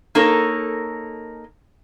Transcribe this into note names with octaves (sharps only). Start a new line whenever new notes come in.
A#3 D#4 A4 A#4 C#5